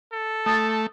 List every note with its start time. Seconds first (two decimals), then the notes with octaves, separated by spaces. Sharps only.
0.12 A4
0.46 A3 A5 D#6 A6